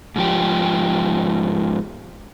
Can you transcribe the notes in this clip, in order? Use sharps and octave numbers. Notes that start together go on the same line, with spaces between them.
G#2 F3 G4